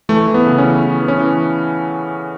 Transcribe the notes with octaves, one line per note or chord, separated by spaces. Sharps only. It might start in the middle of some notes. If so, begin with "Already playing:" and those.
E3 A3
E3
B3
C#3
C#4
E3
E3
E3
C#4
E3